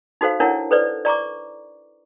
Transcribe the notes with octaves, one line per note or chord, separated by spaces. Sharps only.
D#4 F#4 A4 C5 F5
D4 E4 A#4 C#5 F#5 A5
A4 B4 C5 D5
D5 A#5 C#6 D6